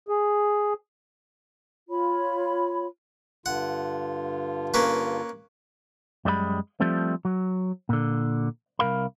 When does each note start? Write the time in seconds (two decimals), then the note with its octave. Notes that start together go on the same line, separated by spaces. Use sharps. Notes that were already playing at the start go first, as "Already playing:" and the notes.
0.08 G#4
1.89 F4 C#5 B5
3.46 G2 D3 F4 F#5
4.74 A#3 C#4 B4
6.25 F#2 G3 G#3 D5 B5
6.80 F3 G3 A3 C4
7.25 F#3
7.89 A#2 D3
8.79 C2 F#3 A#4 F5 B5